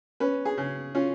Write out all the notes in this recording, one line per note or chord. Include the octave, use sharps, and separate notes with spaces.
C#4 B4
G#4
C#3
C#4 F4